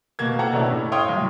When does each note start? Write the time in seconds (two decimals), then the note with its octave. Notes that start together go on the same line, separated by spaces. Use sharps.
0.19 B2 A#3 G#6
0.39 A4 C5 F#5 G5 A5 A#5
0.53 B2 A3 C#4 D4 E4
0.71 A2
0.92 C#5 F5 G5 C6 D#6
1.09 C2 F#3